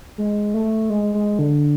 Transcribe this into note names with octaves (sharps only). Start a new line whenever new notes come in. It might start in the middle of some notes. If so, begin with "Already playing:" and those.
G#3
A3
G#3
G#3
D3